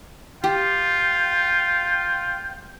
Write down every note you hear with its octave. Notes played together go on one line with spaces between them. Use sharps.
F4 G4 G5